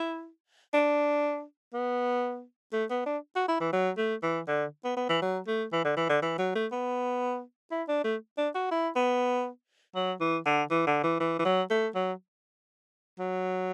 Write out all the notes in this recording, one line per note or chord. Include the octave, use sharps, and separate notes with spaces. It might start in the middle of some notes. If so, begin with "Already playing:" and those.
Already playing: E4
D4
B3
A3
B3
D4
F#4
E4
E3
F#3
A3
E3
D3
B3
B3
E3
F#3
A3
E3
D3
E3
D3
E3
F#3
A3
B3
E4
D4
A3
D4
F#4
E4
B3
F#3
E3
D3
E3
D3
E3
E3
E3
F#3
A3
F#3
F#3